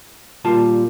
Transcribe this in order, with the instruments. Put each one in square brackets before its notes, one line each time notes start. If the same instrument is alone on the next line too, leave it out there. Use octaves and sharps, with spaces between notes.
[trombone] A#2 [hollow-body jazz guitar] G3 F4 A5